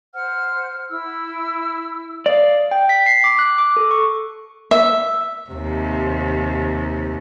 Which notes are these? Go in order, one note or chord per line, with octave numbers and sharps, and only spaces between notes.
C5 F#5 F6
E4 E6
D5 F5 D#6
G5
B6
C7
D6
F#6
D6
A4
C#6
E5
D#2 C3